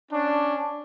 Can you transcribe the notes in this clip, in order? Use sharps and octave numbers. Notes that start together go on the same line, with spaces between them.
C#4 D4